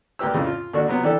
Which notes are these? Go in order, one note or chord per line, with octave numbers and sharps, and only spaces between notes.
D2 A#3 G4 B4 E6
F2 A2 C#3
F4
D#2 A3 D4 F#4
C3 F#3 B3
E3 D4 G4 A4